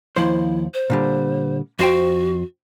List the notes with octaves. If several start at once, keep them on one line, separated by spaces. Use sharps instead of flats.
D#2 F3 E4 C5
C5
A#2 D3 G3
F2 F#4 C5 G5